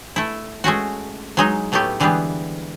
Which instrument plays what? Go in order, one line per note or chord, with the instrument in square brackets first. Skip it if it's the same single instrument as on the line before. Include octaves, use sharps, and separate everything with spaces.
[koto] A3 E4
G#3 A3 C#4 F#4
F#3 G#3 D#4
A2 F#3 A3 B3 G4
D3 E3 G3 G#3 B3 G4